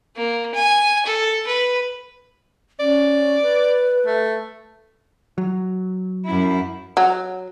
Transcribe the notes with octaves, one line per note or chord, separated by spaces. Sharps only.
A#3
G#5
A4
B4
C#4 D5
B4
A3
F#3
F#2 E4
F#3